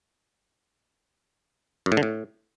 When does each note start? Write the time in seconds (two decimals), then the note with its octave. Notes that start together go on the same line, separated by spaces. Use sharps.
1.86 F#2
1.92 A2
1.97 D3
2.03 A2